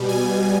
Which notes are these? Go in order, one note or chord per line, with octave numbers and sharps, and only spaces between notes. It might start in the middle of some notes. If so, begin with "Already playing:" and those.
Already playing: B2 G3
G#5